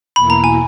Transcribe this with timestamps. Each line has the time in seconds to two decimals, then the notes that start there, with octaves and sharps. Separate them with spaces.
0.16 E2 B2 A#3 E4 B5
0.30 A#5
0.44 G#5